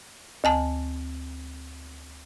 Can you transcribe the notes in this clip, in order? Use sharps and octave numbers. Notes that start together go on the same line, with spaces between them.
D2 G#5 A5